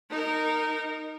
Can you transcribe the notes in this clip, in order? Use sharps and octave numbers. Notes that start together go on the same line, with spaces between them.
D#4 A#4